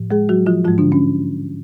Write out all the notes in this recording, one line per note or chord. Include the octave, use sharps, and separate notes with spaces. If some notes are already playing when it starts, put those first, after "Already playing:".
Already playing: A2 F3
G#3 G#4
F#3 F#4
F3 F4
G#2 F3 G#3 F4
D3 D4
C#4